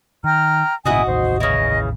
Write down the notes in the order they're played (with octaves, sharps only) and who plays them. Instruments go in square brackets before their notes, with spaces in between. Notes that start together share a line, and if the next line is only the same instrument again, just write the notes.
[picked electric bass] D#3 [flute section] G5 A#5 F6
[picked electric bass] G#1 A#2 C#3 [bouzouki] D#4 F#4 F#5 [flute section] E4 G#5
[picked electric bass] A1 D#2 [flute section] C5
[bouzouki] C#3 E3 [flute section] D#5